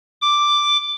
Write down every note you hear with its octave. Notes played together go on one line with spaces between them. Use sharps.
D6